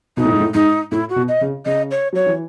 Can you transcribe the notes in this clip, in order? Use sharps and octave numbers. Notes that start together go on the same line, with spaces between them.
B2 D#4
A2
G#2
A2
G#2 D#4
A2 E4
F#4
B2
D#5
C#3
C#3 D#5
C#5
F#3 C#5
E3